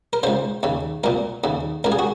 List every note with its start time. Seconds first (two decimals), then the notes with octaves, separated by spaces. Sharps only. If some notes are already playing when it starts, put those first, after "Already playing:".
0.13 A#4
0.23 C#2 C#3 C5
0.63 D#2 C#3
1.04 C2 A#2 A#4
1.44 D#2 C#3
1.84 C#2 C#3 A#4
1.92 G#4
1.99 F#4